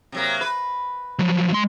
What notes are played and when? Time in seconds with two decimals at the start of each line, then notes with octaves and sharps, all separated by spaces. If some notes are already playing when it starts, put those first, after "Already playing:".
0.12 C3 F#3 A#3
0.41 B4
1.19 F3 F#3
1.52 G#3 C6